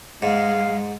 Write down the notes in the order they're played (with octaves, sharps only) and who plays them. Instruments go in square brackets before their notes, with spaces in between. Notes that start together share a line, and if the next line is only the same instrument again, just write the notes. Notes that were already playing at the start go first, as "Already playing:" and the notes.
[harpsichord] G#2 [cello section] G#3 [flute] F5